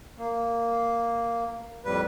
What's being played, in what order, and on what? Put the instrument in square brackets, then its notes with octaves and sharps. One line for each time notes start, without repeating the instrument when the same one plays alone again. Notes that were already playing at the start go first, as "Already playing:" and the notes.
[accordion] A#3
F2 A2 G3 B4